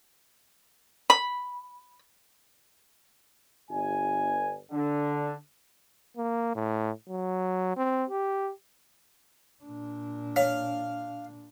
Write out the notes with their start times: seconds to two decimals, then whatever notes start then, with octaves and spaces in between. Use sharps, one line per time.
1.10 B5
3.70 G1 G#5
4.72 D3
6.17 A#3
6.55 A2
7.09 F#3
7.77 C4
8.10 G4
9.63 A#2 D4
10.36 C#5 F5